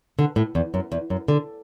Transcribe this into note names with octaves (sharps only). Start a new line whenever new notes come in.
D3
A2
E2
F#2
E2
F#2
D3